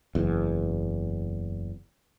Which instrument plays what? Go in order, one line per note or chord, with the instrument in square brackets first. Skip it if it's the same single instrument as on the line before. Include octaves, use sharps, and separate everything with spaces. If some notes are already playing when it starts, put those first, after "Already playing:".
[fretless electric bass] F#1 E2